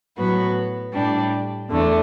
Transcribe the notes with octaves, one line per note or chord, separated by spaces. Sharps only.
A2 F#3 B3 F#4 B4
A2 G3 D4
E2 D3 A3